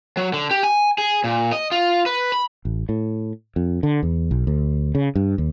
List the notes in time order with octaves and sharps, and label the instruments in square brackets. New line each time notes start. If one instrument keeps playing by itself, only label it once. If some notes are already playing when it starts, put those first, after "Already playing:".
[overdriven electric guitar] F#3
D3
G4
G#5
G#4
A#2
D#5
F4
B4
B5
[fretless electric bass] A1
A2
F2
D3
E2
B1
D2
C#3
G2
D#2